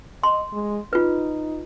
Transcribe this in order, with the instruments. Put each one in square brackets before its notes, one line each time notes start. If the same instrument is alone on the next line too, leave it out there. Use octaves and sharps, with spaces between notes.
[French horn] D#5 [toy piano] C6
[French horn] G#3
[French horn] D#4 [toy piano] F4 B4